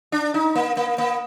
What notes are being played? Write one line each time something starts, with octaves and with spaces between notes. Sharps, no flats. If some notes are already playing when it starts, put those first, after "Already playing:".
D4
D#4
A#3
A#3
A#3